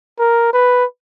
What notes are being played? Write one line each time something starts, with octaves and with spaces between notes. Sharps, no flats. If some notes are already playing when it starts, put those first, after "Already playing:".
A#4
B4